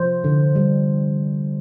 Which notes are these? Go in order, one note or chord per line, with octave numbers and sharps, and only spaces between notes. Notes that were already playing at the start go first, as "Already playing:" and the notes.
Already playing: C3 F3 C5
D3
G3